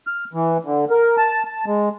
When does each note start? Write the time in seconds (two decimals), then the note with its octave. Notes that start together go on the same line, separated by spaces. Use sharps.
0.07 F6
0.33 E3
0.65 D3
0.90 A#4
1.17 A5
1.44 A5
1.66 G#3